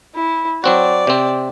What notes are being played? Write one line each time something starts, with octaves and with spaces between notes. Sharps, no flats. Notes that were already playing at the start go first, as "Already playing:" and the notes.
E4
F#3 C4 F#4 D5
C3 C4